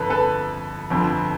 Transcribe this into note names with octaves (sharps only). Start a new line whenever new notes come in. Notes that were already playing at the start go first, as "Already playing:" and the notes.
Already playing: G1 F2 A4 B4
A4 B4
G1 F2 D3